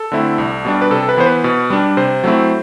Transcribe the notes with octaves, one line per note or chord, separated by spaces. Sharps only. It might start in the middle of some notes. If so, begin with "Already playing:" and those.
Already playing: A4
D3 A3 C4 E4
C2
B2 G3 D4
B4
C3 A4
B4
E3 B3 C5
B4
B2
G3 D4
C3 C5
F#3 A3 C4 E4